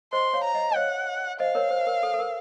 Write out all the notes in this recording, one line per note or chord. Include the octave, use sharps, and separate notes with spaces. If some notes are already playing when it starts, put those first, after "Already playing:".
C5 D#5 C6
C#5 F5
A#5
D#5 F#5
D#5
C#5 F5 F#5
C5 D#5 F5
A#4 C#5
C5
A#4
A4
A4
A#4